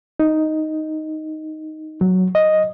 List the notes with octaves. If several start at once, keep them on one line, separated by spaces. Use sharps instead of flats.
D#4
F#3
D#5